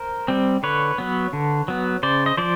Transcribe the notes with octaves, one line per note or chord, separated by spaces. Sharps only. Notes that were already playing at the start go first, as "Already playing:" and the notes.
Already playing: A#4 C5
G3 C4
D3 B4 C#5
F#3 B3
D3
F#3 B3
C#3 C5 D5
D#5
F3 C5 D5